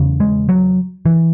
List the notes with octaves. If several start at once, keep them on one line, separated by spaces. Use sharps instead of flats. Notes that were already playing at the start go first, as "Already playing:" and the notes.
Already playing: E2 C#3
G#3
F#3
E3